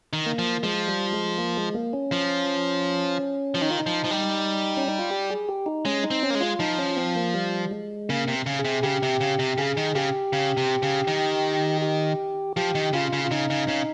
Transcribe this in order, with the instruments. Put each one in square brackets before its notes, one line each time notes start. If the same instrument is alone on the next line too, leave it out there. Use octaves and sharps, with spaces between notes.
[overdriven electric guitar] D#3
[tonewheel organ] A#3
[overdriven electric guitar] F3
[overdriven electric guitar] F3 [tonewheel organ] G#3
[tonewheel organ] G3
G#3
A#3
G#3
A#3
C#4
[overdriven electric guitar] F3
F3
[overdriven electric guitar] D#3 [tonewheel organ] D#4
[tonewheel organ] F4
D#4
[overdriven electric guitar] F3
F3
G3
[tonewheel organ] C#4
D#4
F4
G4
G#4
G4
D#4
[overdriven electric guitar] G#3 [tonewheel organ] C#4
[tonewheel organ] D#4
[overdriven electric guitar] C4
[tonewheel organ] C#4
[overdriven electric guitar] A#3
G#3
[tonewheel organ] F4
[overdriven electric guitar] F3 [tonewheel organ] D#4
[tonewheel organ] C#4
C4
A#3
G3
G#3
[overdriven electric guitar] C#3 [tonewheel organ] A#3
[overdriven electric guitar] C3
C#3
[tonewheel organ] G#4
[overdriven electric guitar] C3
[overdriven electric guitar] C#3 [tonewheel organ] G4
[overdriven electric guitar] C3
C#3
C3
[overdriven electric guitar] C#3 [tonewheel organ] G#4
[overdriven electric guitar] D#3
[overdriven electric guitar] C#3 [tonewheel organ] G4
[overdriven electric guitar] C#3
C3
C#3
D#3
[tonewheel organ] G4
[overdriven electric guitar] F3 [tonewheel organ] G4
[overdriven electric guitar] D#3
[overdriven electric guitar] C#3 [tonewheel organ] F4
[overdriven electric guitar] C#3
[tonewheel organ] F4
[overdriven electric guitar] C#3 [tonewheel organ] D#4
[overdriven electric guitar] C#3
C#3